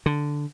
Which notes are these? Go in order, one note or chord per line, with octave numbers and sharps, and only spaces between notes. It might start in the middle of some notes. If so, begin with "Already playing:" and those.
D3